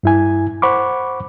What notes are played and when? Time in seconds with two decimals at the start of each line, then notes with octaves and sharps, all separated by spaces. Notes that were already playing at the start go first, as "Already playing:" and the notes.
0.03 G2 E4 G#5
0.62 C5 F#5 B5 C#6 D6